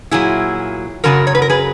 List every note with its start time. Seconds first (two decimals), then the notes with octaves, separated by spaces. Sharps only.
0.11 A#2 F#3 E4 G#4
1.04 F#2 C#3 F#3 F#4 A#4
1.27 C#5
1.35 B4
1.42 A#4
1.50 G#4 B4